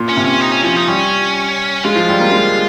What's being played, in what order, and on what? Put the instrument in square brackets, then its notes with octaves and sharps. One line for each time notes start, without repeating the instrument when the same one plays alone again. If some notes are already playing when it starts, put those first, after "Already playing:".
Already playing: [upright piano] A#2
[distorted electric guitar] C#4
[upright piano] C3
[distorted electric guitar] C#4
D#4
C#4
[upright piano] F3 [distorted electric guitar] C#4
[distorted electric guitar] D#4
[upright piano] G3 [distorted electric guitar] C#4
[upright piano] G#3 [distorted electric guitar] F4
[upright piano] F3
G3
A#3
G#3